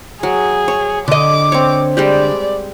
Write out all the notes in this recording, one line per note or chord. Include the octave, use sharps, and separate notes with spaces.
F#3 G#4
C#5
D3 D#5 D6
C4 C#5
G3 G#3 G4 D5